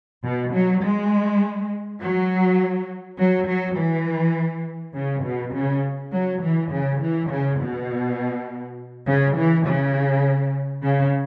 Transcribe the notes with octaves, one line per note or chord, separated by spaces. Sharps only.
B2
F#3
G#3
F#3
F#3
F#3
E3
C#3
B2
C#3
F#3
E3
C#3
E3
C#3
B2
C#3
E3
C#3
C#3